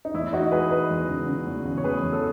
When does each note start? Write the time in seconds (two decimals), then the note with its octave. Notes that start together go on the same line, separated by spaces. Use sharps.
0.05 D#4
0.14 E2 E4
0.33 E2 D#4 F#4
0.51 G#3 G#4 B4
0.70 G#3 B4 D#5
0.90 E2
1.08 C#3
1.27 C#3
1.47 E2
1.65 C#3
1.78 C#5
1.84 E2 G#4 B4
2.03 E2
2.13 A4 C#5